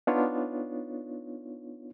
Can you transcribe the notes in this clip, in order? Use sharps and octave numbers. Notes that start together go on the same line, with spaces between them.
B3 D4 D#4 F4 C#5